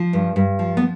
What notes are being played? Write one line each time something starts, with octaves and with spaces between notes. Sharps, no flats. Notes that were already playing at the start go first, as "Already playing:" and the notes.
Already playing: F3
G2
G2
F3
B3